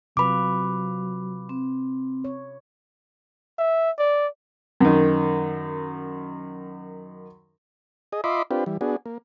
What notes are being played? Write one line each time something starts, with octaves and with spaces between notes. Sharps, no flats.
C3 F#3 F4 B4 B5 D6
C4
C#5
E5
D5
F#2 D#3
G#4 D#5
F4 D#5 E5 B5 C6 D6
C4 D4 F4 G4 B4
E3 G3
B3 D4 F#4 G#4
A#3